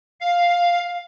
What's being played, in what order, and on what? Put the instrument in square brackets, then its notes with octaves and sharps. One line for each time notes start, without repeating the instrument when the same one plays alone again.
[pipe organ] F5